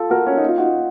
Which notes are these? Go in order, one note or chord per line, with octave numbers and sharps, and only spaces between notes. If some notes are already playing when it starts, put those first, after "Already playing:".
Already playing: F4 A4
F#4 A#4
C#4
D#4
F4
D#4 F#4